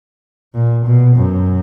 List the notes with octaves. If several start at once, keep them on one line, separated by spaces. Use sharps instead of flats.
A#2
B2
F#2